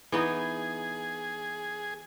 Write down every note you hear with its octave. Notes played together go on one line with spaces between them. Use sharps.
E3 B3 D#4 G#4